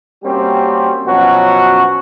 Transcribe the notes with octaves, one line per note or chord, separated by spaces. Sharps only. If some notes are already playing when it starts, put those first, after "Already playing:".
G3 A#3 C4 C#4 F#4 G4
B2 F3 F#3 C#4 F#4